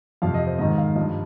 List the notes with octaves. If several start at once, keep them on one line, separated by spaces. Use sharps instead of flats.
F2 C3 F3 F5
D#5
C5
G#2 D#3 D#5
F5
G2 F3 D#5